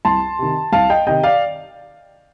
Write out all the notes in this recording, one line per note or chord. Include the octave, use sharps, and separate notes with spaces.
C2 A5 C6
C3 D#3
C2 F5 A5
D#5 G5
C3 D#3 D#5 G5
D5 F5